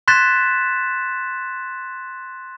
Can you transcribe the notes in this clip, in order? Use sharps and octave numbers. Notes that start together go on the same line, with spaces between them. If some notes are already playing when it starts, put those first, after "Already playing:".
C6 F#6 G#6 A6 B6 E7